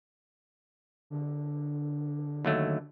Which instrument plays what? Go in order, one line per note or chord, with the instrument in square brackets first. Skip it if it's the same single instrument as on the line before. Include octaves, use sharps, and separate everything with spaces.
[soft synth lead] D3
[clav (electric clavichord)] D#2 F#3 A3